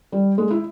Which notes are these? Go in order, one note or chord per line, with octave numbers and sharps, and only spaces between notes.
G3
G#3
E4